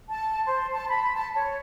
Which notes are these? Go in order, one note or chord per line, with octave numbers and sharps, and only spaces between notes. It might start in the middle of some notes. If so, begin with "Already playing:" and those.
A5
C5
A5
B5
A5
C#5